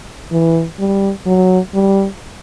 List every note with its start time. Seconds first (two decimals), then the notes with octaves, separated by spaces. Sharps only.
0.32 E3
0.79 G3
1.26 F#3
1.74 G3